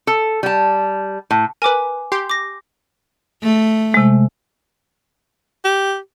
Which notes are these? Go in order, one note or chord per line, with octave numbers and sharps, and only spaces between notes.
A4
G3 A5
A2
A#4 B4 G#5 D6
G4 C6 G6
D6 A#6
A3
C3 G#3
G4